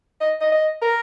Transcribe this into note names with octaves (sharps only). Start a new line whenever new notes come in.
D#5
D#5
D#5
A#4